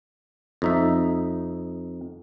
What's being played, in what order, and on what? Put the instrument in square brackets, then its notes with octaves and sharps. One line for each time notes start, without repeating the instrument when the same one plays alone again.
[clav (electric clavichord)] F2 D#4 E5